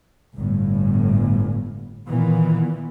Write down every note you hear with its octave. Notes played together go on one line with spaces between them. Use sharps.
G1 A2
A#2 D#3 E3 B3